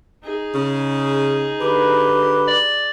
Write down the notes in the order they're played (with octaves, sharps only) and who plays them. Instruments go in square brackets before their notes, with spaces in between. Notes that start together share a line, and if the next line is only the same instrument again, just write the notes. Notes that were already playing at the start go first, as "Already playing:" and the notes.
[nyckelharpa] D#4 G#4
[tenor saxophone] C#3
[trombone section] D3 B4 [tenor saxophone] G4
[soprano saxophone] D5